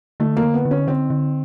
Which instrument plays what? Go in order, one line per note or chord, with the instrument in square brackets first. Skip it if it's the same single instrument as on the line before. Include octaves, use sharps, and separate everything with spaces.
[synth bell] D3 [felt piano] A3
[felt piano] A#3
[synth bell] D3
[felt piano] B3
[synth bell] D3
[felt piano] C#4
[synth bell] D3 [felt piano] C4
[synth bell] D3